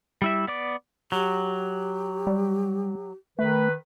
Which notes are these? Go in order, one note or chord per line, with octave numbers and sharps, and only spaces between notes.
G3 E4 E5
B3 D5 D6
F#3 G4
G3
D#3 A3 B4